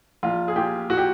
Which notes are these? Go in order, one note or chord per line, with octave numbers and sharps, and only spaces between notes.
A#1 F4
G#4
A#2 G4
A#2 F#4
G4